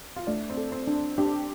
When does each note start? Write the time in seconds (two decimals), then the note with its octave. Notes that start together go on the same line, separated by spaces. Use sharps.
0.16 F4
0.27 A3 D4
0.50 C4
0.57 A4
0.72 C4
0.87 D4
1.18 D4 G4